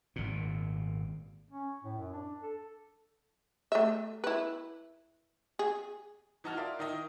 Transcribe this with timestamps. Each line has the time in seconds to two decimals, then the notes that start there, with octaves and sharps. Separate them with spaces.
0.16 G#1 A#2
1.50 C#4
1.84 A2
1.98 F#2
2.13 D4
2.42 A4
3.72 A3 E5
4.24 E4 B4
5.59 G#4
6.44 E3 D#4 F#4 A5 F6
6.57 F4 A#4 D5 E5
6.79 D#3 D#4 E4 D#5